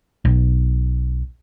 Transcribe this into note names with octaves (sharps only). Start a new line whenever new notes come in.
B1